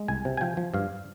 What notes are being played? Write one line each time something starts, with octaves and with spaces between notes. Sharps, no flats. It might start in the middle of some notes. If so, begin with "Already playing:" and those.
Already playing: G#3
C2 G#5
C3
G#5
F3 G5
F3
G2 F5